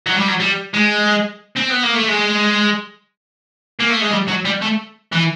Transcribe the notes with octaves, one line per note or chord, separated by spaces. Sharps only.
F#3
G3
F#3
G3
G#3
C4
B3
A#3
A3
G#3
A#3
A3
G#3
G3
F#3
G3
A3
E3